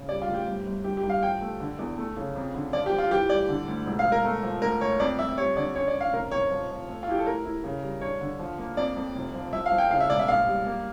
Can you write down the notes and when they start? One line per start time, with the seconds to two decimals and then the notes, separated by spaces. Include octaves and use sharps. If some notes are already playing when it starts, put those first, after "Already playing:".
Already playing: C#3
0.09 G3 D5
0.22 F4
0.28 D2
0.34 G4
0.47 G1
0.66 G1
0.84 G2 G4
0.97 G4
1.03 G2
1.09 F5
1.22 F3 G5
1.41 A3
1.60 D3
1.79 E2
1.98 A3
2.17 C#3
2.36 F2
2.55 D3
2.73 F3 D5
2.86 G4
2.92 F3
2.98 F4
3.11 E3 G4
3.29 G3 D5
3.49 D3
3.68 D2
3.86 E1
3.99 F5
4.05 E1
4.12 A#4
4.25 A3
4.43 F3
4.62 D2 A#4
4.81 D2 C#5
5.00 F2 D5
5.19 F2 E5
5.38 G3 C#5
5.56 D3 D5
5.75 C#4 C#5
5.88 D5
5.95 C#4
6.01 F5
6.13 F1 A#4
6.31 F1 C#5
6.51 F3
6.70 F3
6.89 A3
7.03 F4
7.08 E4 G4
7.19 A4
7.27 D2 A#4
7.45 E4
7.64 C#3
7.83 G3
8.01 D4 C#5
8.21 D3
8.39 F3
8.58 A#3
8.77 F2 D5
8.96 F2
9.15 F1
9.34 F3
9.53 F3 E5
9.66 F5
9.72 F3
9.78 G5
9.91 C#3 F5
10.00 E5
10.09 E1 D5
10.19 E5
10.28 A#1 F5
10.47 G3
10.66 A#3